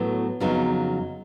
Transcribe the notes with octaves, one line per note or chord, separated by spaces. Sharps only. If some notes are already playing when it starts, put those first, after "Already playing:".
Already playing: A2 F#3 B3
F2 C#3 F#3 B3 D#4